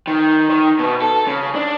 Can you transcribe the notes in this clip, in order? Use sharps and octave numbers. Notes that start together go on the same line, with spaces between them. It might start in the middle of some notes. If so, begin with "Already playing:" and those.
D#3
D#3
B2
A4
C#3
D4